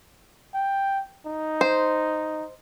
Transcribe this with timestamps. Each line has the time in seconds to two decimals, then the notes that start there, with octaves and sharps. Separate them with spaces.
0.54 G5
1.26 D#4
1.61 C5